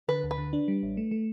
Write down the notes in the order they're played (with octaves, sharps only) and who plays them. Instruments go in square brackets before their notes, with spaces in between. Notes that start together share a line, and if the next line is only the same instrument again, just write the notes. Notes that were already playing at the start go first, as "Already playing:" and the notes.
[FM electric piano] D3 [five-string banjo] B4
[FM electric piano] D2
[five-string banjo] B4
[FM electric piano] D3
D4
G3
A1
A3
A3